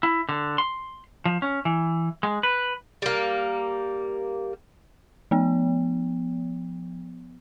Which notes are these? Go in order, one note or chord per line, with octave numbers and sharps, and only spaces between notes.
E4
D3
C6
F3
C#4
E3
G#3
B4
G3 A#3
F3 B3